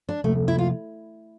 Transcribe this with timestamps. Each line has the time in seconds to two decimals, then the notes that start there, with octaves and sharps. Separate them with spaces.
0.09 D4
0.24 C3 F3 A3 A#3
0.48 E4
0.58 F4